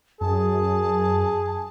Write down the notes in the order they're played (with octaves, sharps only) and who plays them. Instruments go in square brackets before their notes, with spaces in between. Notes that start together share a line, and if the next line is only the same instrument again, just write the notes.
[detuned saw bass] F#2 [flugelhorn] G#4 [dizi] A5